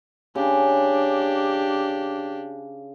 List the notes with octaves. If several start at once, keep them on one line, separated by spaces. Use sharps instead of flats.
C#3 D4 G4